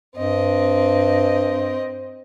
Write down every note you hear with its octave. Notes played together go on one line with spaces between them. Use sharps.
G2 C4 D#5